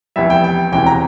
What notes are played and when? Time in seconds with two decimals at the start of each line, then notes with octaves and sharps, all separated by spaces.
0.16 F1 E2 E3 G3 E5
0.30 G5
0.44 G5
0.72 E1 E2 C3 E3 G5
0.86 A#5